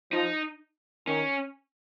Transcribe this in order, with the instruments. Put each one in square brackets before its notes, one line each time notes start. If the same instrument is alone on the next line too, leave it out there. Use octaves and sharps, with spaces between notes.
[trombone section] F3 [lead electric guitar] D#4
[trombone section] D#3 [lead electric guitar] C#4